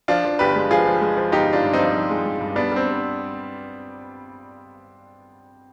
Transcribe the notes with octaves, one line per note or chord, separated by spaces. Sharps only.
F3 D4 F4
F3
G1 G4 B4
G#3
F3 F4 G#4
F3
G#3
F3
G1 D#4 G4
G1
D4 F4
G2
C4 D#4
F3
F3
G#3
G#3
G2
G3 B3 D4
G3 C4